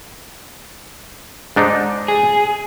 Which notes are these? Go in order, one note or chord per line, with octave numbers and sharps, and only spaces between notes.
G#2 D4 D#4
G#4